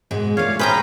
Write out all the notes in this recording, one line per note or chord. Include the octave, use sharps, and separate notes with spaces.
G#2 B2 G#3
A#2 A3 C#5 F5
A2 C#4 G#4 B4 C5 G5 A#5